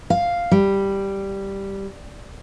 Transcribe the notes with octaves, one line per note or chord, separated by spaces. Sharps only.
F5
G3